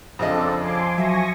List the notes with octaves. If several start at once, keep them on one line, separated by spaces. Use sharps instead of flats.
F2 C#3 C4 D4 A4 D#5
F3 G#5 C6 D6
F#3 E5 G#5 C#6 A#6